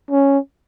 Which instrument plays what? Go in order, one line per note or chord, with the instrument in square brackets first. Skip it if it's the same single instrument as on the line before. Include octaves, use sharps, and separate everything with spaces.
[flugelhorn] C#4